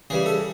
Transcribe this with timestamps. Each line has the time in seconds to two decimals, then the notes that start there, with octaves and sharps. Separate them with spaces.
0.10 C#3 E3 G3 G#4
0.26 A4